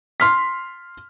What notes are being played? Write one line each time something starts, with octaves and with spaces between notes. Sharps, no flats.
C6 F6 B6